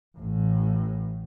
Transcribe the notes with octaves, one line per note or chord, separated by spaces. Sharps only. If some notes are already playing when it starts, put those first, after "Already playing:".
A1 A2